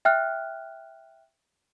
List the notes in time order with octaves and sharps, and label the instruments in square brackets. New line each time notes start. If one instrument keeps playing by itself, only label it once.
[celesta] E5 G5 F6 F#6